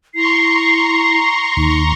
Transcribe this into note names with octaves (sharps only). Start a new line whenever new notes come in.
E4 A#5 C6 C#6 C7
D#2 D#4